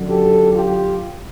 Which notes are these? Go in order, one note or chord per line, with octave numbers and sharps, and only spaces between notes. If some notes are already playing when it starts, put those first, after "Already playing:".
Already playing: F#2 D3 F#3
G4 A4
F4 G4